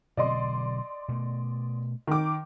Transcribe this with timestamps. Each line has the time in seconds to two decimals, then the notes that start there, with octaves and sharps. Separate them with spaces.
0.17 B2 D3 F#3 D5 D#5 C6
1.08 B2 A3
2.07 D#3 D6